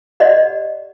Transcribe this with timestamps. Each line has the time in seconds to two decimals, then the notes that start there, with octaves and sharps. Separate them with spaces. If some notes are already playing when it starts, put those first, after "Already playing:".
0.20 G4 D5 D#5 F#5